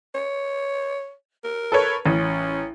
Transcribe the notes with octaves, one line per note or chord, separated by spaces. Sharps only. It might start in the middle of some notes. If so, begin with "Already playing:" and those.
C#5
A#4
A4 B4 C#5
A1 C#4